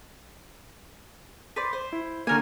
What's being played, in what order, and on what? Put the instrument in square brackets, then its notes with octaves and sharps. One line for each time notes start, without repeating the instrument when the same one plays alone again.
[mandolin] B4 C5 D5
C5
[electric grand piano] E4
[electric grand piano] D3 A#3 [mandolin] F#4 A#4 G#5